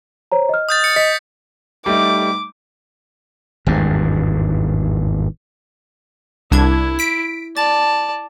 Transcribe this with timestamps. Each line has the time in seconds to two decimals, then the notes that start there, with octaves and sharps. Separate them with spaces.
0.32 C5 C#5 A#5
0.49 D#5 F6
0.69 D#6 G6 A6
0.84 C#7
0.96 D#5 B6 C#7
1.86 G3 A3 D#4 D6
3.66 G#1 E2 G2
6.51 C2 D4 E4 G#6
6.99 B6 D7
7.57 D5 A5 A6